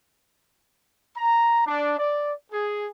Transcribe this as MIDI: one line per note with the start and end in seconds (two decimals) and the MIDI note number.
1.17 1.62 82
1.67 1.96 62
1.99 2.34 74
2.52 2.88 68